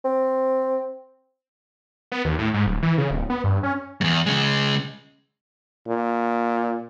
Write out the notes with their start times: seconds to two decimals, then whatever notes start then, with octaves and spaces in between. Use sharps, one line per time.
0.05 C4
2.12 B3
2.25 D#2
2.39 A2
2.54 G#2
2.67 D1
2.83 E3
2.98 C#3
3.11 D1
3.30 B3
3.44 G2
3.63 C#4
4.01 E2 G#2
4.26 C#3 G#3
5.87 A#2